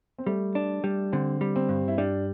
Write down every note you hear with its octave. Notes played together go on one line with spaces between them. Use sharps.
C4
G3 A3
D4
G3
D3 C4
G3
C4
G2
E4
G3 D4